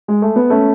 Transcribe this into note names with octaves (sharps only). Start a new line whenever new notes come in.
G#3
A3
B3
A3 C#4